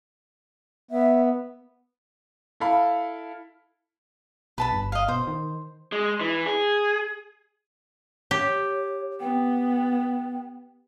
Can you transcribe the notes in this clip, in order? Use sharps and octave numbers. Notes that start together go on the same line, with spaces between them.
B3 E5
E4 A4 F5 B5
B1 B4 A5 B5
G1
D#5 F5
B2 C5
D#3
G#3
E3
G#4
G4 C#5
B3 G5